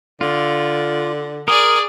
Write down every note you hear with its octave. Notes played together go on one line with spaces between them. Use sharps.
D3 F4
G#4 A#4 D5 D#6